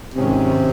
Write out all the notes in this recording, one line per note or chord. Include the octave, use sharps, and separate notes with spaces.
G#1 G#2 C3 D#3 G#3 C#4